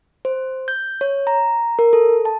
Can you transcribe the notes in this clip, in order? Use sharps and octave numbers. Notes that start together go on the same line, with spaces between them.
C5
G6
C#5
A#5
A#4
A4
A5